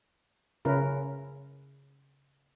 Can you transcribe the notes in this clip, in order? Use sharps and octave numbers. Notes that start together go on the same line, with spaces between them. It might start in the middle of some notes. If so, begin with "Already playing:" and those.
C#3 C#4 E4 A#4 B4